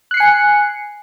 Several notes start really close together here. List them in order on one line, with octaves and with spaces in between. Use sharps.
F#6 C7 C#7 G#5